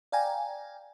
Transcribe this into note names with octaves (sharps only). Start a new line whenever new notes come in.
D5 F5 G5 G#5 A#5